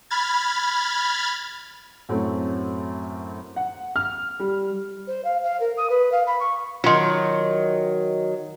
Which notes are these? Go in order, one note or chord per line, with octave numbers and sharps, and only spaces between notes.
B5 F6 G#6 A6
F#2 A2 F#3 A3 C4
F#5
F6
G3
C5
F5
F5
A#4
D#6
B4
F5
B5
C#6
D#3 F#3 F4 C6